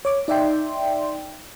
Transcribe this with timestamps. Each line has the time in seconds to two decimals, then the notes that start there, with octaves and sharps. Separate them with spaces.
0.05 C#5 D6
0.28 D#4 D5 E5 G5 C6